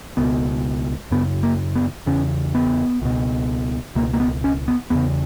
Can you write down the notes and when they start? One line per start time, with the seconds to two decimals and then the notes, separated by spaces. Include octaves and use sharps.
0.17 C#2 B2 B3
1.11 F#2 C#3 B3
1.43 A#3
1.75 B3
2.06 E2 C#3 C#4
2.55 B3
3.02 C#2 B2
3.95 C#2 B2 A#3
4.13 A#3
4.20 B3
4.44 C#4
4.68 B3
4.90 E2 C#3 B3